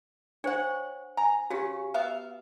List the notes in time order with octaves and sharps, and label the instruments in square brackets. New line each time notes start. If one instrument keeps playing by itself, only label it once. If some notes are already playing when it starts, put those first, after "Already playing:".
[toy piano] D4 C5 [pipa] C#5 F#5
[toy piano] G#5 [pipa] A#5
[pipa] C#3 C#4 [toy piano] F#4 G4
[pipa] B3 E5 F5